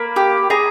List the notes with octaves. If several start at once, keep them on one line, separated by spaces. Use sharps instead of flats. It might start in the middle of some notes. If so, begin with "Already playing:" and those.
Already playing: A#3 B5
G4
G#4 A#5